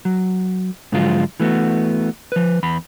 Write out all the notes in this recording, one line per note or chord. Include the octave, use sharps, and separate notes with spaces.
F#3
G#2 D3 F3 F#3 G#3 F4
E3 A3 B3 F#4
F3 B4
E2 B5